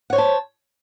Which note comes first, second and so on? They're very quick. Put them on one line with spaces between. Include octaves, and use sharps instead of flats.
F#5 C#5 C5 A5